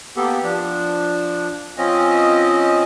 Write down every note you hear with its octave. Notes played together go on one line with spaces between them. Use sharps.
A#3 B3 G4 A4
F3 D4
F3 C4 C#4 D#5